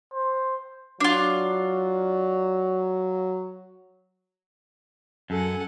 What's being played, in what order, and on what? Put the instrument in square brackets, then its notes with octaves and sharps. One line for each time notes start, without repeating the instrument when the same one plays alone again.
[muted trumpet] C5
[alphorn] F#3 [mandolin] D4 F4
[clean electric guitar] F#2 [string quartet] A4 F#5 G#5